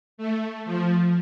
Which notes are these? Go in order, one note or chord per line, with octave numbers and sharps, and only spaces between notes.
A3
F3